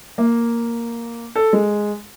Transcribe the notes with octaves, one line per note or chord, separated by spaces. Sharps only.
A#3
A4
G#3